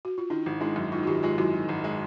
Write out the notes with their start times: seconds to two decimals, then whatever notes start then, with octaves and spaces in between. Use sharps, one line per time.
0.05 F#4
0.18 F4
0.30 D#3 D4 E4
0.46 G#1
0.61 G#3 D4 E4
0.76 F#2
0.92 D#3 D#4 F4
1.03 F#4
1.07 G#1 F4 G4
1.23 G#3 F4 G4
1.38 F#2 E4 F#4
1.54 D#3
1.69 G#1
1.84 G#3